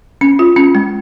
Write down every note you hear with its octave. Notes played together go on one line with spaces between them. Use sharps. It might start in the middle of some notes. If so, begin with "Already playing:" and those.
C#4
F4
C#4
G#3